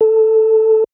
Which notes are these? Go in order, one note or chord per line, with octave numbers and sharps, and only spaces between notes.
A4